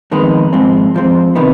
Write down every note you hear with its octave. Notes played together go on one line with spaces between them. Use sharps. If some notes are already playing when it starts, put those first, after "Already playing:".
F2 D#3 G#3 B3 D#4
G#2 F3 C4
G#2 F3 C4
C3 D#3 B3 D#4